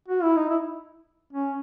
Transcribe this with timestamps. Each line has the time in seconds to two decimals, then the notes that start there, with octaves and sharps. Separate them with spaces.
0.08 F#4
0.23 E4
0.36 D#4
0.50 E4
1.33 C#4